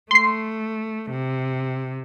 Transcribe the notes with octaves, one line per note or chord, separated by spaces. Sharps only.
A3 C6 C7
C3